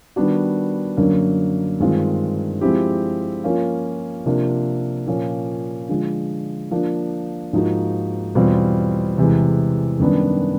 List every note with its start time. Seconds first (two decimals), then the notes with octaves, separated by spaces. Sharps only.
0.16 D#3 G3 B3 D4 F#4
0.97 F#2 D3 F#3 A#3
1.80 G2 D#3 G#3 C4 F4
2.61 F3 G#3 C4 E4 G4
3.44 F3 A#3 C#4 F4
4.26 C3 F3 A#3 D4 F4
5.07 A#2 F3 A#3 C#4
5.89 D3 F3 G#3
6.71 F3 A#3 D4
7.53 G#2 F3 A#3 D#4 F#4
8.35 E2 B2 G3 C4 F4
9.18 E2 C3 E3 G#3
10.00 F#2 D#3 G3 B3 D4